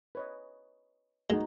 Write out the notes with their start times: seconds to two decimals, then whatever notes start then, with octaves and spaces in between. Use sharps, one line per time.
0.15 B4 C#5 D#5
1.30 G#3 D#4 F#4